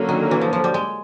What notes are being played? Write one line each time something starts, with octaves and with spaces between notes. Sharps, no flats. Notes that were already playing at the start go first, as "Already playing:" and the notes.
Already playing: D3 F#3 A#3 C#4
D#3
E3
F3
F3
G3
G#3